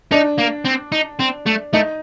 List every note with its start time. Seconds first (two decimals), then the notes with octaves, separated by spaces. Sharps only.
0.12 D4 D#4
0.39 A#3
0.65 C4
0.92 D#4
1.19 C4
1.46 A3
1.73 A3 D#4